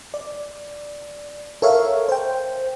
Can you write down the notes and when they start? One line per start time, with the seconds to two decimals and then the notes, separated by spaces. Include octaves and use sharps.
0.14 D5
1.62 A4 A#4 C#5 E5 F5
2.09 C5 G5